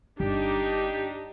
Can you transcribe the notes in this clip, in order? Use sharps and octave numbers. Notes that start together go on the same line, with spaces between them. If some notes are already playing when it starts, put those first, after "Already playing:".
G1 D4 D#4 G4